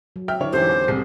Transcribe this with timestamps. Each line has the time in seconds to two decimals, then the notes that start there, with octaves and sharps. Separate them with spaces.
0.16 F#3
0.28 E5 G5 F6
0.40 D3 D#3 D4 E4 C#5
0.53 E1 E3 C#4 G4 A4 C5
0.69 E2
0.88 C2 C4 G#4 C7